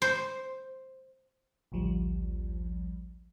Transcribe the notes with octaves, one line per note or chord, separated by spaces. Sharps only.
C5
A1 D2 F3 G3